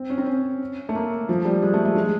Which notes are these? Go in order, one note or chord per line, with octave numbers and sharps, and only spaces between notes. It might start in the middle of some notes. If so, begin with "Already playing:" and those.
Already playing: C4
C#4
C4
C#4
A3
A#3
F3
G3
G#3
A3
A3
G#3